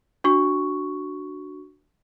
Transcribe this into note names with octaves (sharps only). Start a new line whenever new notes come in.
D4 F#4 C#6